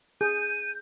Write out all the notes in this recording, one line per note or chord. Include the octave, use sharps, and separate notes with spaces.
G#4 G6 D#7